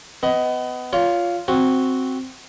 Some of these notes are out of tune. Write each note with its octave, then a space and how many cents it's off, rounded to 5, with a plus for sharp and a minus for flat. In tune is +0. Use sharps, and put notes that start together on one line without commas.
B3 +25 D#5 +15
F4 +0 C#5 +30
C4 +0 F#4 +0